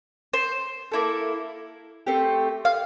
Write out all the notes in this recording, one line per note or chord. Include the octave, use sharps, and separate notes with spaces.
C5
A#3 E4 A4
A3 C4 G4
F5